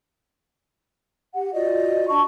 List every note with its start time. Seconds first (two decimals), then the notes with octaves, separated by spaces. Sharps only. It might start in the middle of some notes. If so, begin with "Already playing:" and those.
1.35 G4 F#5
1.53 F4 F#4 D5 D#5
2.08 D4 A5 C#6